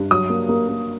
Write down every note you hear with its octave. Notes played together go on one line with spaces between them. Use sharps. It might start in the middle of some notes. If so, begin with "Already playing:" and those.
Already playing: G2
F#3 D#6
A#3
A#3
A#3